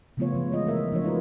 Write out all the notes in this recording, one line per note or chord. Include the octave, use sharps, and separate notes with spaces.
C#3 F3 A3 B3 F4 C#5
F3
E3 G#3 F4 D#5
A3 A#4 E5
F3 D4 F4 C#5
E4 F#4 A#4 B4